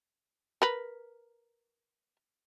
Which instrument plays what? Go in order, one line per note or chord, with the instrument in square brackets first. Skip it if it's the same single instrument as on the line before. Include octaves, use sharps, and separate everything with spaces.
[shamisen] A#4 B4